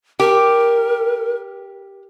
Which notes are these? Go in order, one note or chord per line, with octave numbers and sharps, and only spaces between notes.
G4 A#4